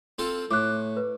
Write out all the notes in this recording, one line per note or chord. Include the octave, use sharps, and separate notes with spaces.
C4 F4 A4
A2 D6 F#6
B4